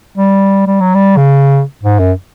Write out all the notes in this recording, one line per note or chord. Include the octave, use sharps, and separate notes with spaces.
G3
G3
F#3
G3
C#3
G#2
F#2